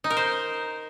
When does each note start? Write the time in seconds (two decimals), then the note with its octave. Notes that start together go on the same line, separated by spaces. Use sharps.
0.04 D#4
0.10 A#4
0.17 C5